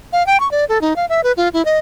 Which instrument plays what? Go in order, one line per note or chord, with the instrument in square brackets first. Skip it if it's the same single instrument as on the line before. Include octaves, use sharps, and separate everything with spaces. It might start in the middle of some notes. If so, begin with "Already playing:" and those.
[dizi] F5
G5
C#6
D5
A4
D#4
F5
E5
B4
F4
E4
D#5